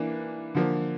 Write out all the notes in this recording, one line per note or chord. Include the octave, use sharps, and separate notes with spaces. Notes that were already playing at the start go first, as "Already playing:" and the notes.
Already playing: E3 A#3 D4
D3 F3 A#3